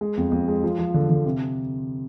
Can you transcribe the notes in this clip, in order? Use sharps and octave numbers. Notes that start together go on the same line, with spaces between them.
G#3
F2
F2
G#3
F3
F3
D3
D3
C3